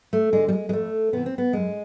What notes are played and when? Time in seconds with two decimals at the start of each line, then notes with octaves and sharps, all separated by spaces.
0.13 A3
0.33 D3 G#3
0.48 G3
0.53 G#3
0.69 G#3
0.73 F2 A3
1.13 C3 E3 B3
1.26 C4
1.38 B3
1.53 F#2 G#3